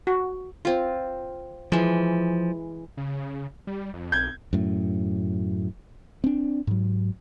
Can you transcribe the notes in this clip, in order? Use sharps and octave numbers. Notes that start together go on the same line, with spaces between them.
F#4
C4 F4
E3 F3 G#3
C#3
G3
F2
B1 G6 G#6
F#2 A2
C4 D4
G#2 F#3